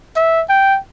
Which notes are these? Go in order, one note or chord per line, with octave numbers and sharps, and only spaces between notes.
E5
G5